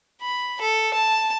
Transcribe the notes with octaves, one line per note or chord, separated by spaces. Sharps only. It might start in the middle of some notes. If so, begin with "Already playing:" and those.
B5
A4
A5